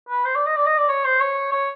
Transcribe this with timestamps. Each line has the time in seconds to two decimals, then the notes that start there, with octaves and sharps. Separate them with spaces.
0.09 B4
0.25 C5
0.35 D5
0.46 D#5
0.56 D5
0.67 D#5
0.78 D5
0.89 C#5
1.05 C5
1.21 C#5
1.52 C#5